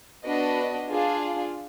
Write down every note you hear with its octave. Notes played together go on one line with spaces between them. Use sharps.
B3 D4 F#4 B4 D#5
D4 F4 G#4